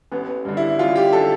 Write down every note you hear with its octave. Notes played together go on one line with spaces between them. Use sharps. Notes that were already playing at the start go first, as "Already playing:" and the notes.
A1 B3
G2 D3
E4
A1 F4
G4
A4
D3